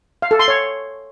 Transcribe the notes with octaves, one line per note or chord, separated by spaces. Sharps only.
F5
A4
C6
C#5